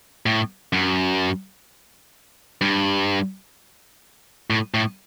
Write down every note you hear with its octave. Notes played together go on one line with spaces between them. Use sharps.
A2
F#2
G2
A2
A2